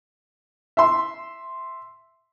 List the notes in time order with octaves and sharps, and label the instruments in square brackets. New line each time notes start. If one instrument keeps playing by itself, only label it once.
[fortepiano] E5 C6